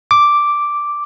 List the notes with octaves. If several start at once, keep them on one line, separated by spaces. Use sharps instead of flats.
D6